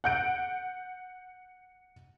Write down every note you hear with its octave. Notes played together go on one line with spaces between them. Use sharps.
F#5 G6 D7